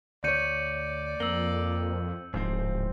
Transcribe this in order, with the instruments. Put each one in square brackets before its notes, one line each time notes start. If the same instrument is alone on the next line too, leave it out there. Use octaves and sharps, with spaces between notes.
[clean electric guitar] D2 C#5 [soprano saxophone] D5 [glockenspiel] G6 C#7 D#7
[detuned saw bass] F2 [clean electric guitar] A#3 [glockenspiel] E6 F#7 G7
[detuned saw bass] D1 [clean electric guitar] G#2 F3 C4